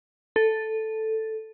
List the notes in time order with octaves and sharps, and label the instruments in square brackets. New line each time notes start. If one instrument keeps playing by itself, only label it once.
[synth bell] A4